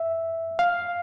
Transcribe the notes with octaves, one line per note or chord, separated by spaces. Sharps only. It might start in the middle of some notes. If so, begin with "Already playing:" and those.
Already playing: E5
F5